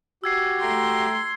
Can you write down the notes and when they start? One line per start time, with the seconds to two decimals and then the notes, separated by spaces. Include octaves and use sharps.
0.24 F#4 G4 E6 G#6 C7
0.61 A3 G5 A#5 C6